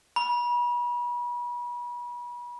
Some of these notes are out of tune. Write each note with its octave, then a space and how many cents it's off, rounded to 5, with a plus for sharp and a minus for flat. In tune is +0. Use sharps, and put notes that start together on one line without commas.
B5 -35